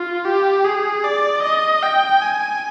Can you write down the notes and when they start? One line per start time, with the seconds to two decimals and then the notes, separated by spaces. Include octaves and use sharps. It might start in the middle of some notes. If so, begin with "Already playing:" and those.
Already playing: F4
0.24 G4
0.64 G#4
1.04 D5
1.43 D#5
1.82 G5
2.22 G#5